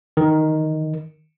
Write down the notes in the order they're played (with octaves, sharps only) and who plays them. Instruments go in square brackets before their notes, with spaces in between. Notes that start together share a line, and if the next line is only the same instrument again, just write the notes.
[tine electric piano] D#3